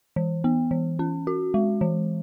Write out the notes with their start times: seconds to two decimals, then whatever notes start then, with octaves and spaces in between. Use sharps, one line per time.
0.16 E3
0.44 B3
0.71 E3
0.99 C#4
1.27 F#4
1.54 G#3
1.81 E3